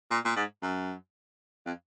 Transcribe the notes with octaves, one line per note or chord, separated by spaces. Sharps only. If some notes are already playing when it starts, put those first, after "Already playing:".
A#2
A#2
G#2
F#2
F2